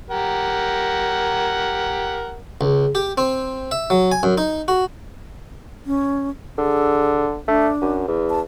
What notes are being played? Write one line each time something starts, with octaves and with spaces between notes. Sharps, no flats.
G4 A#4 F#5
C#2
G4
C4
E5
F#3
G#5
F#2
D#4
F#4
C#4
D3 G#4
A3 D4
F#2
E2
A5